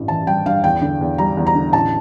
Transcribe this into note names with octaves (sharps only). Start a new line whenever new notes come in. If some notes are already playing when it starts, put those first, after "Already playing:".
Already playing: A1 G2 G3
E3 A5
G3 G5
G2 F5
E2 G5
D3
E2
G3 A#5
E2
A#5
D3
A1 A5